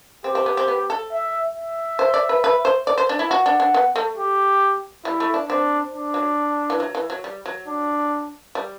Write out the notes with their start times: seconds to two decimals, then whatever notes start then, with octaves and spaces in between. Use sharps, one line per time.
0.24 C4 G4
0.35 C4
0.46 B3
0.57 C4
0.68 B3
0.90 A4
1.12 E5
1.55 E5
1.99 C5
2.14 D5
2.29 B4
2.44 B4
2.65 C5
2.87 D5
2.98 C5
3.09 D4
3.19 E4
3.30 F#4 F#5
3.46 D4
3.60 D4
3.74 B3
3.96 A3
4.18 G4
5.05 G3 E4
5.20 A3
5.34 D4
5.48 C4 D4
5.93 D4
6.14 F#3
6.70 E3
6.80 F#3
6.95 E3
7.10 F#3
7.24 G3
7.46 F#3
7.67 D4
8.55 G3